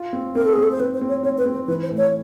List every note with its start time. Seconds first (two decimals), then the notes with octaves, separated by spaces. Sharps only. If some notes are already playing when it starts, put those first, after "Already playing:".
Already playing: F4
0.13 C4
0.35 C4 A#4
0.45 A4
0.53 G#4
0.57 C4
0.63 A4
0.72 C5
0.80 C4 B4
0.94 C5
1.01 C4
1.08 C#5
1.23 C4 C#5
1.38 B4
1.46 C4
1.53 C5
1.67 E3 B4
1.83 C5
1.90 A2
1.97 C#5